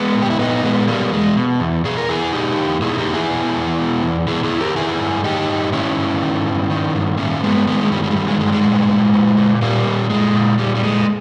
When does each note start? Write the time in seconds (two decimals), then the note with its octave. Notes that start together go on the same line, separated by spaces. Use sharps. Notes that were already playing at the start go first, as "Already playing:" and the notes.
Already playing: G#3 B3
0.15 A#2
0.22 G4
0.30 E4
0.39 A#2 B3 D#4
0.63 A#2 G#3 B3
0.87 B2 G3 A#3
1.12 E2 G#3
1.37 B2
1.60 E2
1.84 B2 G#4
1.97 A#4
2.09 E2 E4 G#4
2.33 B2 D#4 G4
2.57 E2
2.81 B2 E4 G#4
2.94 E4
2.98 D#4 G4
3.07 E2
3.14 E4 G#4
3.31 B2
3.55 E2
3.78 B2
4.03 E2
4.28 B2 E4 G#4
4.44 E4 G#4
4.51 E2
4.60 G4 A#4
4.76 D#3 E4 G#4
5.00 G2
5.24 D#3 D#4 G4
5.49 G2
5.73 D#3 C#4 E4
5.97 G2
6.22 D#3
6.47 G2
6.70 D#3
6.95 G2
7.18 D#3 A#3 C#4
7.43 G2 G#3 B3
7.67 D#3 G#3 B3
7.80 G#3
7.92 G2 G3
8.03 G3
8.11 G#3
8.16 D#3 G3
8.28 G#3
8.40 G2 G#3
8.53 G#3
8.64 A#2
8.88 A#2
9.14 A#2
9.37 A#2
9.62 A#2 G3 A#3
9.86 A#2
10.10 A#2 G#3
10.34 A#2
10.59 A#2 G3
10.75 G3
10.83 A#2 G#3